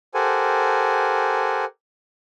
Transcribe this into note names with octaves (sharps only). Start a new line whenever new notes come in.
G4 A4 A#4 C5 F#5 G#5